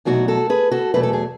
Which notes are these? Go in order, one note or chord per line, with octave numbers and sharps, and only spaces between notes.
E2 B2 F#3 A3 D#4 F#4
F#4 A4
G#4 B4
F#4 A4
E2 B2 F#3 A3 B4
A4
G#4